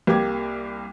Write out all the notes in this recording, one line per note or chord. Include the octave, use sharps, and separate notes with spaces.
C2 A#3 G4 D6 G#6